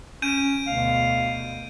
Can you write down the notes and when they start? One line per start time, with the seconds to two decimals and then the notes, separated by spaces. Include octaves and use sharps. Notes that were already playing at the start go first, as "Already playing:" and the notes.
0.22 C#4 G6 D7 D#7
0.67 D2 B2 F5